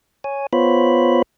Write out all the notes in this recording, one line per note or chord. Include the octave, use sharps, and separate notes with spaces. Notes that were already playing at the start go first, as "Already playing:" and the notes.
C#5 G#5
B3 F4 C5 C#5 B5